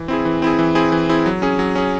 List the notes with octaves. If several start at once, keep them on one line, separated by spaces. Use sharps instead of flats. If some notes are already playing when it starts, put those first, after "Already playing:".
Already playing: E3
C4 E4 G#4
E3
C4 E4 G#4
E3
C4 E4 G#4
E3
C4 E4 G#4
F#3
C#4 G#4
F#3
C#4 G#4